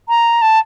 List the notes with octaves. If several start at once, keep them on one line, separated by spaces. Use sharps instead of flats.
A#5
A5